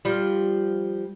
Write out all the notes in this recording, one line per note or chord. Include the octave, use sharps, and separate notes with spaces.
F3 G3